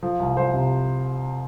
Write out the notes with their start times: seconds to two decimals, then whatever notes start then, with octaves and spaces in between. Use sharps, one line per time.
0.03 F3
0.20 C2
0.37 F3 C5
0.54 C3